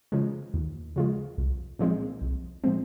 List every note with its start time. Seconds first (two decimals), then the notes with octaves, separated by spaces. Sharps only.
0.12 C#3 F3 G#3
0.54 D#2
0.96 C#3 F3 G#3
1.38 C2
1.79 A#2 F3 G#3 C4
2.22 C2
2.64 A#2 F3 G#3 C4